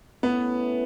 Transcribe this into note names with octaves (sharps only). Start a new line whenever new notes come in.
A3 B3 C#4 E4 B4